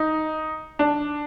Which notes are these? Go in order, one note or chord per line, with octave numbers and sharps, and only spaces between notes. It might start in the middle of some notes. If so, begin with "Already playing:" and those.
Already playing: D#4
D4